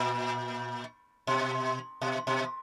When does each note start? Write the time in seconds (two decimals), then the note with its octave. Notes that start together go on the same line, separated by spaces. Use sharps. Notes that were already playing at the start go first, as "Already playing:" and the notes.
Already playing: A#2
1.27 B2
2.01 B2
2.27 B2